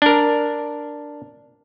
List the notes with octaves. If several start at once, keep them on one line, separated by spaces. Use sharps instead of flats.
D4 A#4